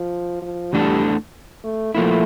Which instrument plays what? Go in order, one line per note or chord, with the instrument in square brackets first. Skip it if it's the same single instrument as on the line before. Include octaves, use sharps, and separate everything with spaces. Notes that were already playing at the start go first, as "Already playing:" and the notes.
Already playing: [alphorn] F3
F3
[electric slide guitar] E2 E3 A3 D4 A4 [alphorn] G3
[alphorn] A3
[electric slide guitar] F3 A#3 E4 [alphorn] A3